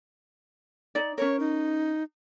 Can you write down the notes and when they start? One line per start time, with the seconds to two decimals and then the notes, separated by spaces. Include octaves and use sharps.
0.95 D#4 D5
1.18 C#4 A#4 C#5
1.40 D#4